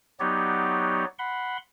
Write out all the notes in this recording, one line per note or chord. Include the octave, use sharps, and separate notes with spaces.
F#3 B3 D#4 G4 C#5 D5
F#5 B5 C6